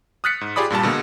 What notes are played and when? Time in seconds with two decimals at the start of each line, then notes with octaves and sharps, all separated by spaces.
0.24 D#6 F6 F#6 A6 B6 C#7
0.41 G#2
0.56 F4 G4 G#4 D5 B5 D#6
0.70 G2 A#2 G3 A5
0.83 B2 D3 G#3 A#3